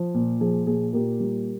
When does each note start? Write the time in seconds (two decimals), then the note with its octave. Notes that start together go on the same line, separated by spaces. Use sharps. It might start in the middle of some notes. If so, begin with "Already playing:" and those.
Already playing: F3
0.14 A#2
0.41 F3 G#4
0.67 A#2 G#4
0.93 A#2 G4 A#4
1.20 G3